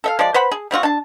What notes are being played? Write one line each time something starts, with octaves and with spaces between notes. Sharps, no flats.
A4 E5 F5
F3 G#3 D5
B4 C5 F#5 B5
G#4
G3 C4 F4 F#4
D4 A5